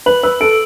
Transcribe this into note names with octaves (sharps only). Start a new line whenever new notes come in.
B4 F#7
B4 E6
A4 D7